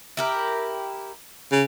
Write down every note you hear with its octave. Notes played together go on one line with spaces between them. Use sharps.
E4 G4 A#4
C#3